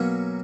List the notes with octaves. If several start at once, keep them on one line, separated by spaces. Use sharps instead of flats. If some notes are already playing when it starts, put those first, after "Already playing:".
Already playing: B2 F#3 A#3 C#4